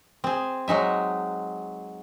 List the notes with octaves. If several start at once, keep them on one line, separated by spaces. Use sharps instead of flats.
C4 G#4
F#3 G#3 D#4 E5